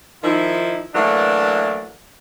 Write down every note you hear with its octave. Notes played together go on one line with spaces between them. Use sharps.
D#3 F3 D#4 E4
E3 F#3 A3 A#3 D4